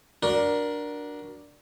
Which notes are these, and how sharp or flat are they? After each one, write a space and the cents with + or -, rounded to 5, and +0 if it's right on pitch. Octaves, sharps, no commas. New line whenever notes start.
D4 +0 F#4 +0 A#4 +20